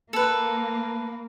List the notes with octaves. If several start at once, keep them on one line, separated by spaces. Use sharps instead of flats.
A#3 A4 B4